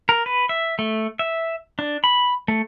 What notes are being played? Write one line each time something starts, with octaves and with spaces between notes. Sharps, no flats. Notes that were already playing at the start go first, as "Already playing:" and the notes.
A#4
B4
E5
A3
E5
D4
B5
A3